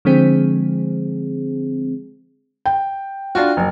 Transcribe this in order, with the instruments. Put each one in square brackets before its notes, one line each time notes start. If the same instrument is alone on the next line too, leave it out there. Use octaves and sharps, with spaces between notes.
[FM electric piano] D3 F3 G#3 C4 G#4
[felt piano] G5
[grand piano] D4 F4 F#4
F#1